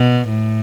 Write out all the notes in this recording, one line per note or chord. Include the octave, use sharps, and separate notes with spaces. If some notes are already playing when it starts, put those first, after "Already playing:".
Already playing: B2
A2